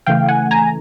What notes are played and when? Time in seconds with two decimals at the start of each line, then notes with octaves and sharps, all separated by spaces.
0.06 C#3 E3 A3 F5 G5
0.28 F#5 G#5
0.51 G#5 A#5